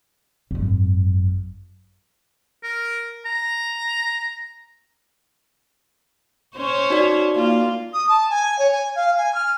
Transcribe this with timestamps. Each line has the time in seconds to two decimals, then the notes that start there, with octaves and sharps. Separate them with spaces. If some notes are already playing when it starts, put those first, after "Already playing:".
0.51 G#1 F#2
2.63 A#4
3.26 A#5
6.57 C#4 C5 C#5
6.90 D#4 F#4 D5
7.35 A#3 F4
7.93 D#6
8.08 A5
8.29 G#5
8.58 C#5
8.71 G#5
8.95 F5
9.17 G#5
9.34 F6